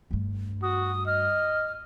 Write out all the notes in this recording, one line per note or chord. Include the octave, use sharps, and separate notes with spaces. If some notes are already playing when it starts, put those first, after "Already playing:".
G2 A3
F#4 D#6
D#5 F6